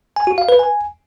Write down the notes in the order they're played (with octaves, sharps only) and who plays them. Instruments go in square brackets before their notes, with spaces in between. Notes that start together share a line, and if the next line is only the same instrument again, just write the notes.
[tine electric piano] G#5
F#4
F5
B4
G#5